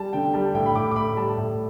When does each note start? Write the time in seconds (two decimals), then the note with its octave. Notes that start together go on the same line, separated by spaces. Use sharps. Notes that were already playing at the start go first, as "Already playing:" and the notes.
Already playing: G3 A5
0.13 D3 G5
0.33 G3 A5
0.55 A2 G5
0.66 B5
0.75 A2 D6
0.91 D6
0.96 A2 B5
1.16 G3 A5
1.38 A2